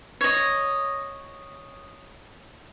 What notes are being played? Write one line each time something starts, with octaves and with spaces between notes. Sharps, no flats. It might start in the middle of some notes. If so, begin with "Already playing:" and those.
C#5 D#5